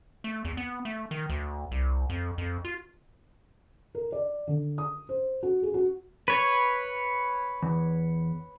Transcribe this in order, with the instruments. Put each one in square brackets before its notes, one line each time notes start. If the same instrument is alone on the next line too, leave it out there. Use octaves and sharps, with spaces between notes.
[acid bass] A3
E2
B3
A3
D#3
D2
C2
F2
F2
F4
[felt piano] A#4
D5
D3
D#6
C5
F#4
G#4
F#4
[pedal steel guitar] B4 C#5
[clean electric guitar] E2